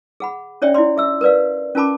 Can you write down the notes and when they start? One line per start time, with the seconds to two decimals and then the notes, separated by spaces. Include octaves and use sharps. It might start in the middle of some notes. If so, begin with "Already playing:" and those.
0.20 G#4 F#5 B5
0.62 C#4 D4 C#5 D5 E5 G5
0.74 E4 F4 D5 C6
0.97 G#4 E5 E6
1.21 A#4 B4 D5 F5
1.75 C#4 F4 A#4 A5 B5 D6